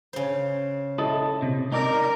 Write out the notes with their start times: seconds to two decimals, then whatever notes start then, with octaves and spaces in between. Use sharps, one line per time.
0.13 C#3 C5
0.98 E4 A4 D#5
1.42 C3
1.72 D#4 A#4 D5